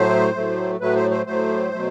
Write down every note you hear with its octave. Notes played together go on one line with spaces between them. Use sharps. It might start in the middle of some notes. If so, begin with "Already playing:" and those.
Already playing: A2 F#3 A3 C5
A2 F#3 A3
A2 F#3 A3 B4
C5
C5
A2 F#3 A3 C5
B2 F#3 A3